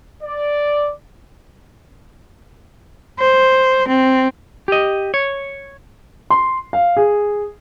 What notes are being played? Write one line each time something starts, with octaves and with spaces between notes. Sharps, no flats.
D5
C5
C4
G4 D#5
C#5
C6
F5
G#4